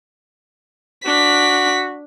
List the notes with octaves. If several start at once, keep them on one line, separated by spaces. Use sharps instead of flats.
D4 F#4 B6